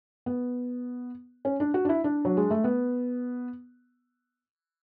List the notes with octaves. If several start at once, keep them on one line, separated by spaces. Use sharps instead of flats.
B3
C#4
D4
F#4
D4
E4
D4
F#3
G#3
A3
B3